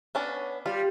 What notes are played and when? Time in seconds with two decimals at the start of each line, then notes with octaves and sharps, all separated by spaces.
0.15 B3 C#4 D4
0.66 G3 F4